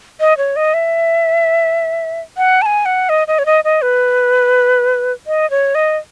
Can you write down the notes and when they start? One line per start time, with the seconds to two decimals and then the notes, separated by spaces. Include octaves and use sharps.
0.20 D#5
0.37 C#5
0.56 D#5
0.74 E5
2.37 F#5
2.62 A5
2.66 G#5
2.86 F#5
3.09 D#5
3.28 D#5
3.39 C#5
3.46 D#5
3.64 D#5
3.82 B4
5.27 D#5
5.50 C#5
5.75 D#5